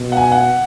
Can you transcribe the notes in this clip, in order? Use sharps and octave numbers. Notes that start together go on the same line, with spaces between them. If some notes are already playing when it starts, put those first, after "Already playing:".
Already playing: B2
F#5
G#5
F#5